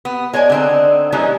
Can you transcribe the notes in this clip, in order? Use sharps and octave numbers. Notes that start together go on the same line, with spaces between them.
B3
G#3 C#5 D5 G#5
D3 C4 D#4
E3 G3 G#3 A#3 C#4 D#4